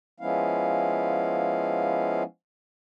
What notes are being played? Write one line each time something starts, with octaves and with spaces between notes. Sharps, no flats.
F3 G#3 B3 C#4 E4 F5